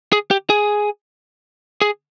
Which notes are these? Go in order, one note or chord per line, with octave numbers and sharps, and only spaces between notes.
G#4
G4
G#4
G#4